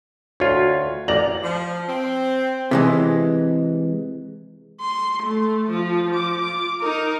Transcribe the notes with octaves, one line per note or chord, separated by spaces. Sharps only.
D2 F4 F#4 C#5
A1 D5 A#5 F#7
F3
C4
C3 E3 G#3
C6
A3
F3 F4
F3 D6
F4 D6
D#4 A#4